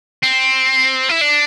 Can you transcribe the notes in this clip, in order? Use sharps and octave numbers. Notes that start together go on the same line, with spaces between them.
C4
E4
D4